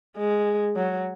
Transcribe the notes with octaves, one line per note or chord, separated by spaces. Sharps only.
G#3
F#3